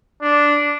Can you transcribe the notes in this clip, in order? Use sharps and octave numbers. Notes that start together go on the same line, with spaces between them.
D4